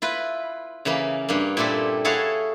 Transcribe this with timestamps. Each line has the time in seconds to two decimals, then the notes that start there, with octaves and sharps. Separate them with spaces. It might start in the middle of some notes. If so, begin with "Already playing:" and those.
0.02 E4 F4 B4
0.85 C#3 E3 A#3 B5
1.29 G2 A#3
1.57 A#2 C4 E4 G4 A4
2.05 E4 G#4 A4 C#5 F5 F#5